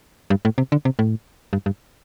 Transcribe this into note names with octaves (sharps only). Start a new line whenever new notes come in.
G2
A2
C3
D3
C3
A2
G2
G2